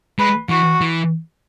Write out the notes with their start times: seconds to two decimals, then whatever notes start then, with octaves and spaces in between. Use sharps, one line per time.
0.19 G#3 B4
0.49 E3 F#4
0.81 E3